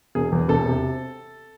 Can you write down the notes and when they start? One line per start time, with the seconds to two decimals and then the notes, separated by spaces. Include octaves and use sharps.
0.15 E1 G#4
0.32 E2
0.49 E1 A4
0.66 C3